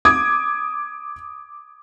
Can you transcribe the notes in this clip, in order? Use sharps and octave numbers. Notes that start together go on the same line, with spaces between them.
D6 D#6 G#6